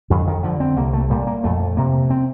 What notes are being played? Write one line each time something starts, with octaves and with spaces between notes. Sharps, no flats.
F2 D3
D#3
D3 F3
C4
C2 A#3
A3
A#2 G3
A#3
F2 A3
C3 A#3
C4